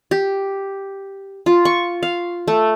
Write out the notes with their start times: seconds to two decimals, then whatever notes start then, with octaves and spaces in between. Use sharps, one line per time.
0.11 G4
1.46 F4
1.65 C#6
2.03 F5
2.48 A3